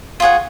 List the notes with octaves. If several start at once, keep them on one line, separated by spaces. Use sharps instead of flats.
F4 G#4 C#5 F#5